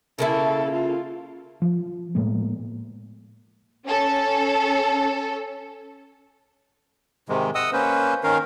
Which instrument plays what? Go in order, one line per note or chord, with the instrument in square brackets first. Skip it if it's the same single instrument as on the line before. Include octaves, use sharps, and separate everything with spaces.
[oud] C#3 A#3 E4 [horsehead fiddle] A4
[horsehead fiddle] F4
[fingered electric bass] F3
A2 G#3 A#3 B3
[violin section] C#4 A4
[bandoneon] G#2 C3 D#3 G#3
D#5 F#5 D#6 E6
A#3 C#4 B4 C5
D#3 C#4 A#4 F5